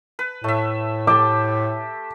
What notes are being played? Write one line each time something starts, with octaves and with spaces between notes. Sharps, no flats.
B4
A2 A3 E5
G4 A4 D6